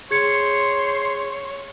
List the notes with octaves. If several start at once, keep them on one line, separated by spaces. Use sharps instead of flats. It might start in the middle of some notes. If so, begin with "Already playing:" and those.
G#4 C5 C#5 C6 G#6 C#7